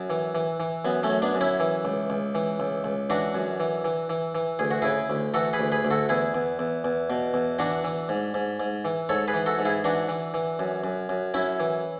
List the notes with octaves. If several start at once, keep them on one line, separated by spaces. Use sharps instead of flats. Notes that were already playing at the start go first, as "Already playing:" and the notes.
Already playing: F#2
E3
E3
E3
F#2 B3
A3 C#4
F#2
B3 D4
F#2
C#4 E4
E3
C#2
C#2
E3
C#2
C#2
E3 D4 F#4
F#2
E3
E3
E3
E3
D2 G#4
F#4
C#3 E4 G#4
D2
E3 F#4 A4
G#4 B4
D2
G#4 B4
D2
F#4 A4
E2 E4 G#4
E2
E2
E2
B2
E2
E3 D4 F#4
E3
G#2
G#2
G#2
E3
G#2 A4 C#5
G#4 B4
E3
F#4 A4
G#2
E4 G#4
E3 D4 F#4
E3
E3
F#2
F#2
F#2
F#2 C#4 E4
E3